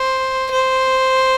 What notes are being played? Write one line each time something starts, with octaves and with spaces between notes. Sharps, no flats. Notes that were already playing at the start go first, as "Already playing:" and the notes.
Already playing: C5
C5